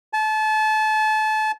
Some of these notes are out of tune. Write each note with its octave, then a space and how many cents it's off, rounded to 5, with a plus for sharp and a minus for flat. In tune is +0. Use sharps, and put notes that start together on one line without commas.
A5 -30